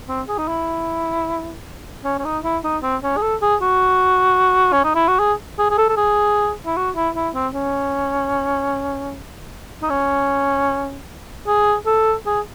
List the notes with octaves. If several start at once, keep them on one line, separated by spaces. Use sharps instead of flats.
C4
G#4
D#4
E4
C#4
C#4
D#4
E4
D#4
C4
C#4
G#4
A4
G#4
F#4
C#4
D#4
E4
F#4
G#4
G#4
G#4
A4
A4
G#4
E4
F#4
E4
E4
C4
C#4
D#4
C#4
G#4
A4
G#4